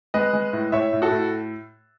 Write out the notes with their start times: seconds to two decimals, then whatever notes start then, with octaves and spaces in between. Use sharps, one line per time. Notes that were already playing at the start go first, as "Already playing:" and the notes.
0.14 G#3 B4 D#5
0.33 G#3
0.53 A2
0.72 A2 C#5 E5
0.93 A2
1.02 F#4 A4
1.11 A2